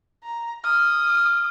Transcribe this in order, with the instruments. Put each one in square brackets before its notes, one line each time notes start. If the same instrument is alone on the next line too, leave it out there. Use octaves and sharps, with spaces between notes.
[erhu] A#5
[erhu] D#6 [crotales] F6